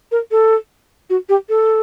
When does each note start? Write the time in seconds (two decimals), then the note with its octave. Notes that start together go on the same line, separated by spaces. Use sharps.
0.12 A#4
0.31 A4
1.10 F#4
1.29 G4
1.49 A4